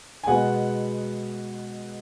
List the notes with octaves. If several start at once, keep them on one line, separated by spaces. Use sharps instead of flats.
G#5
B2 G#3 B3 F#5